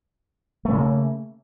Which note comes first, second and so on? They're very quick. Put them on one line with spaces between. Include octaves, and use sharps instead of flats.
A3 C#4 C#3 A#3